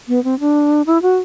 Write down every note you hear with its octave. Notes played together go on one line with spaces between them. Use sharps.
B3
C4
D4
E4
F#4